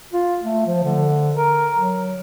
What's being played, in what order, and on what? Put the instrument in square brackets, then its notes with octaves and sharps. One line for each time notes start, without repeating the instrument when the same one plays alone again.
[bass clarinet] F4
A3
F3
D3
A#4
F#3